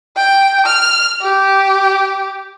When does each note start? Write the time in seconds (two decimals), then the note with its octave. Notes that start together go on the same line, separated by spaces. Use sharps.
0.17 G5
0.66 F6
1.22 G4